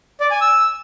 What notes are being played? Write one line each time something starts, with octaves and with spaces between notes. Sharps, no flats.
D5
G#5
E6